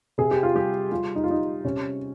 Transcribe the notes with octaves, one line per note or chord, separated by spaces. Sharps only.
C3 G#4
G4
F4
G3 G4
G3 F4
D#4
F4
G3 D#4
C3 C#4